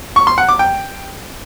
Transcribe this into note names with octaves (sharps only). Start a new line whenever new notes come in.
C#6
C6
F#5
D6
G5